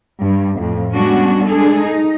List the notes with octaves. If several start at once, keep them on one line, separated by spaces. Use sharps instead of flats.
G2 G3
F2 A2
G3 G#3 B3 C#4 D4 F#4
G#3 D4 G#4 A4
D#4